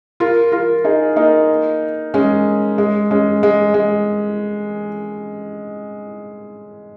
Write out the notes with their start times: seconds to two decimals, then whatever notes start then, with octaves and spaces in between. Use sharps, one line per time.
0.20 F4 A#4
0.52 F4 A#4
0.84 D#4 G#4
1.16 A#3 D#4
2.14 G#3 C#4
2.78 G#3
3.11 G#3 C#4
3.43 G#3
3.74 G#3